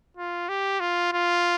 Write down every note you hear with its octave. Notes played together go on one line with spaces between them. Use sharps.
F4
G4
F4
F4